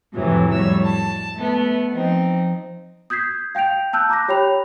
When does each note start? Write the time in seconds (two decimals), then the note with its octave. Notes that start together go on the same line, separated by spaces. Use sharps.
0.13 F2 A2 C3 E3 F#3
0.50 F2 A2 F#3 G3 C#5 E6
0.83 A5
1.36 A3 B3
1.91 F3 C4 D#4
3.10 D#6 G6 G#6 B6 C7
3.55 F5 G5 G6 D7 F7
3.93 A5 E6 F#6 G6
4.09 A#5 D6 F#6 A#6
4.28 G4 C#5 G5 B5 F7